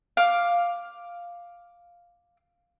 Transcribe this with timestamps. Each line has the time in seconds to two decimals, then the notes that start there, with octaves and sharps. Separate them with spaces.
0.17 F5 D6